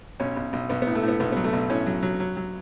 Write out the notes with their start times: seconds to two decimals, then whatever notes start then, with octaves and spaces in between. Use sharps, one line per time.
0.20 B1 C#4
0.37 B1
0.53 B1
0.69 B1 B3
0.82 B3
0.87 A2
0.95 A3
1.03 A2 B3
1.20 B1 B3
1.32 F#3 B3
1.44 A3
1.53 B1
1.70 A2 C#4
1.86 F#3
2.03 F#3
2.20 F#3
2.37 F#3